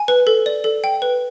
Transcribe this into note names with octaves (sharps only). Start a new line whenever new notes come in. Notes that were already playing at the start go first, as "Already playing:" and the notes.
Already playing: G#5
B4
A4
D5
A4
G5
B4